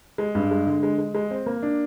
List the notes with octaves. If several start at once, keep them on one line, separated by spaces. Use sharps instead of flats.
G#3
G2
G#3
D3
G#3
G#3
G#3
C4
A#3
D4